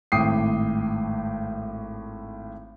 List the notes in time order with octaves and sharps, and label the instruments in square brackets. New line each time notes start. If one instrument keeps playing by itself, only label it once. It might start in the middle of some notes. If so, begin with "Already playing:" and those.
[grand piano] G#1 A2 G5 D6 D#6 C7